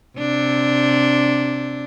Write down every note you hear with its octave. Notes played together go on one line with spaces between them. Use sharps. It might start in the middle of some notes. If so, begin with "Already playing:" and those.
C3 D4